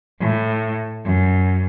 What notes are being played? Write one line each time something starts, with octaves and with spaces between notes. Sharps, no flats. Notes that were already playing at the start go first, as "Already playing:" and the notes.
A2
F#2